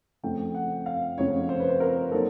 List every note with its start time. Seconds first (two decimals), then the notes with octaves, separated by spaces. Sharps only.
0.23 F2 C#3 F3 A3 G5
0.54 F#5
0.86 F5
1.18 F2 C#3 F3 A3 C#5
1.49 C5
1.60 B4
1.69 C5
1.80 A#4
2.12 F#3 A#3 D#4 A4